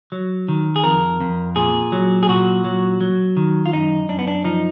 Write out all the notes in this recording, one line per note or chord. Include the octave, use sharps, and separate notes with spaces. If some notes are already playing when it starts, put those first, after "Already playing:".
F#3
D#3
G#4
F2 A#4
F2
A#2 G#4
F#3
G#4
A#2 F#4
F#3
F#3
D#3
F4
F#2 D#4
F#2 D4
B3
D4
F3 D#4